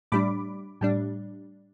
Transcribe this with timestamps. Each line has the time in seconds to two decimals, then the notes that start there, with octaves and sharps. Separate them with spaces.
0.12 A2 G3 D4 B5 D6
0.81 A2 G3 D4